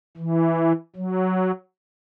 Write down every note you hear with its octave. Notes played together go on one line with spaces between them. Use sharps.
E3
F#3